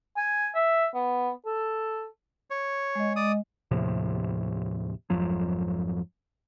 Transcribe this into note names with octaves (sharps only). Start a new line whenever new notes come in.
G#5
E5
B3
A4
C#5
G#3 D#5
D5 D#6
D#2 A2 C3 F3
G#1 F2 F3 F#3